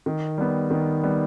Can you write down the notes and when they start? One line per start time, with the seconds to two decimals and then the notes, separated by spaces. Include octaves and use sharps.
0.06 D#3
0.38 G3 B3
0.71 D#3
1.03 G3 B3